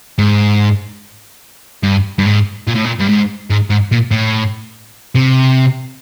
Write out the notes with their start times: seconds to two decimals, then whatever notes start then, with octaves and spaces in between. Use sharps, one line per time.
0.19 G#2
1.83 G2
2.18 G2
2.26 G#2
2.67 A#2
2.75 A2
2.84 A#2
2.99 G2
3.09 G#2
3.50 G#2
3.70 G#2
3.92 A#2
4.11 A2
5.15 C3